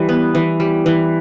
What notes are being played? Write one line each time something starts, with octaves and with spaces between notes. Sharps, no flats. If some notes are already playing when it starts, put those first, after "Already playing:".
Already playing: E3 G3
B3
E3
G3
E3